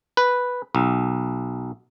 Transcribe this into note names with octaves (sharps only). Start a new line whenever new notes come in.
B4
B1